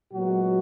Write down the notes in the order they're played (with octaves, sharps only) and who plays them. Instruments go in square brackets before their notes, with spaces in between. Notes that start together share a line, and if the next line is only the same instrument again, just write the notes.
[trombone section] A#2 F#3 G#3 B3 F#4